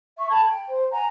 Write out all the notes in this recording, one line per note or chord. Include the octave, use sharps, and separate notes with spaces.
E5 C#6
A4 A5 B5 G#6
G5
C5
F#5 G#5 A#5